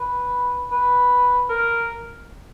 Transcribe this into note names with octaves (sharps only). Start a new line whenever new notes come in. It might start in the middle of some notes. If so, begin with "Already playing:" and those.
Already playing: B4
B4
A#4